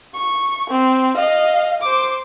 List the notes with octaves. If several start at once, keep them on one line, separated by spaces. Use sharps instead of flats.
C#6
C4
D#5 F5
C5 D6